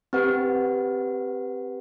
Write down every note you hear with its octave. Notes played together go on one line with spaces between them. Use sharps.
C4 G4 B4 F#5